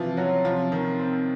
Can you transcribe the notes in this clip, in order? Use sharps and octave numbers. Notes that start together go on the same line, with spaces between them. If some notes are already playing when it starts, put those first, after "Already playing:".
Already playing: C3 E3 F3 F4
F#3 C#4 F#4
C3 F3 F4
D#3
C4